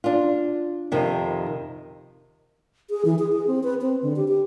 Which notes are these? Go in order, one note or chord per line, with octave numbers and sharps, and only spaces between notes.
D4 F4
F2 C3 D#3
G#4
E3
G#4
G#4
C4
B4
C4
D3
G4
G4